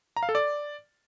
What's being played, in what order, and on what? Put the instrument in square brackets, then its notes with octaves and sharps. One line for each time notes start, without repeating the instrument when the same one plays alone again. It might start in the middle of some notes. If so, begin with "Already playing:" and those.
[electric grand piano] A#5
F5
A4
D5